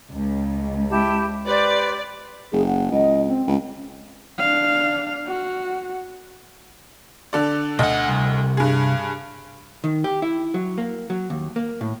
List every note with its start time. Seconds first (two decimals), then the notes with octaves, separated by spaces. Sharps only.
0.10 C#2
0.89 E4 G4 A5
1.46 G4 B4 C5 D5
2.52 F#1 G#4
2.67 F#5
2.92 C#2 D#5
3.26 C4
3.47 C#2
4.38 D4 F5
5.27 F#4
7.33 D3 A4 D5
7.79 D2 B2 D#5 F#5
8.08 C2
8.57 G2 G#4
9.84 D#3
10.04 G4
10.22 E4
10.54 F#3
10.78 A#3
11.10 F#3
11.30 D#2
11.56 A#3
11.81 A2